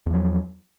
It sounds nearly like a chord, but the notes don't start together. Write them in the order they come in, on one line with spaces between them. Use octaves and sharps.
E2 F3 F#3